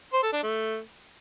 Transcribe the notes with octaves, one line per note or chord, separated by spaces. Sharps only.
C5
A4
D4
A3